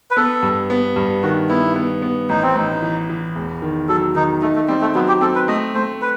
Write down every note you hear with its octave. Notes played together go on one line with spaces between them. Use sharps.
B4
B3 A4
G2
B3
G2
D#3 F#4
B3 E4
B3
B3
A1 D#4
C4
A1 D#4
E3
E3
E1
D#3
F#3 A4
D#3 D#4
A3 D#4
A3
G3 C4
A3
F#3 B3
G4
C4 A4
B4
A3 D#5
A3 C5
B4